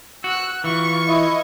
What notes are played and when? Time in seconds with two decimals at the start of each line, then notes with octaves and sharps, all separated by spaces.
0.24 F#4 E6 F#6
0.64 E3 F4 C#6
1.08 E4 D#5